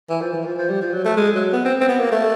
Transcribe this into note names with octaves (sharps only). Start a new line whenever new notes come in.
E3
F3
E3
F3
F3
G3
F3
F#3
A3
G#3
F#3
B3
C4
C4
B3
A#3
A3